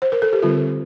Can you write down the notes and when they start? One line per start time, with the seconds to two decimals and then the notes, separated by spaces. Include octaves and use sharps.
0.02 C5
0.12 A#4
0.22 A4
0.33 G4
0.42 D3 G3 C4 F4